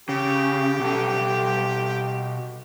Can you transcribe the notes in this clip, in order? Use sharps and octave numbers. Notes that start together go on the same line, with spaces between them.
C#3 G4
B2 A4